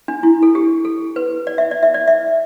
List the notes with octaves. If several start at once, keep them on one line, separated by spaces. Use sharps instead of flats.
D4
E4
A4
G4
A4
B4
D5
E5
D5
E5
D5
E5